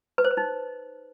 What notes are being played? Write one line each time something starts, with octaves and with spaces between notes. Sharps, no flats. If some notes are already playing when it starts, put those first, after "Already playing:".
B4
C5
B4
D#4